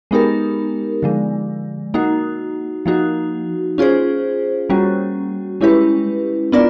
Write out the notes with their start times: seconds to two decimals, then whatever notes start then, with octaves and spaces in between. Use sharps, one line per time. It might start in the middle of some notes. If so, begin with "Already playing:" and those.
0.11 G#3 B3 D#4 G4 A#4
1.03 D3 F3 G#3
1.94 A#3 D#4 F#4
2.86 F3 A#3 D#4 F#4
3.78 C#4 F4 G#4 C5
4.70 G3 A#3 C#4 F#4
5.61 G#3 C#4 E4 G4 B4
6.52 B3 D4 F4 A#4 D5